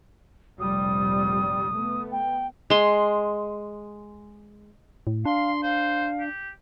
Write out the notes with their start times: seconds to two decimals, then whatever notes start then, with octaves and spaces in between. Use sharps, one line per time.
0.60 F1 A#1 G3 D#6
1.75 A3 B3
2.12 G5
2.70 G#3 C6
5.07 A2
5.25 D4 F5 C6
5.63 C5 F5
6.19 G4